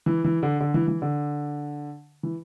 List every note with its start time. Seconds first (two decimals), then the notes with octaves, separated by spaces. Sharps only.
0.06 E3
0.24 E3
0.43 D3
0.60 D3
0.74 E3
0.88 E3
1.02 D3
2.23 E3